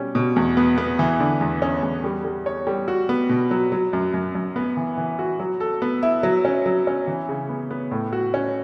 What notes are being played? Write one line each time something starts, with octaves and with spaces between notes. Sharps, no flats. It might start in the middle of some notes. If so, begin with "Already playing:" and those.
Already playing: B2 G3 C#4
B2
E2
B3
B3
E3
D3
E2
C#4
E2
G3
G3
C#5
G3
F#4
B3
B2
F#3
F#3
F#2
F#2
F#2
B3
E3
E3
F#4
F#3
A4
B3
E4
F#3
C#4
F#3
C#4
E3
C#3
B3
B3
A2
F#4
C#4